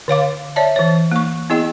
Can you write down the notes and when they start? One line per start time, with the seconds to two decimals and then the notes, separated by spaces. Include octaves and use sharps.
0.08 D3 C#5 F5 D6
0.56 C#5 D5 E5 A5
0.76 E3 C#5
1.11 A#3 C#6
1.50 B3 E4 G#4 D#5 G5